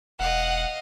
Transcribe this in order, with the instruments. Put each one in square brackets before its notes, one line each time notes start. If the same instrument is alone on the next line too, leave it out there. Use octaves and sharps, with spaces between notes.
[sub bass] E1 [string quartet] D#5 F5 [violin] F#5